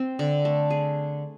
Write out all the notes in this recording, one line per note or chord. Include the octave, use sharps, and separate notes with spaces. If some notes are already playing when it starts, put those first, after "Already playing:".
Already playing: C4
D3
A3
G#4